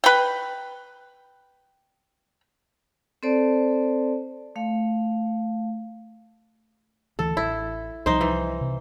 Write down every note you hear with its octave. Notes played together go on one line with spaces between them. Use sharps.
B4 G5
C4 A4 C5 D5 A5
A3 F5
D2 E3 A4
A1 E4
C2 F3 G3 D#4 C5
E3
C3